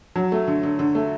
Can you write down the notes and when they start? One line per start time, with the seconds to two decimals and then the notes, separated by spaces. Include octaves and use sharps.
0.16 F#3
0.32 A3
0.48 D3
0.63 D3
0.79 D3
0.95 A3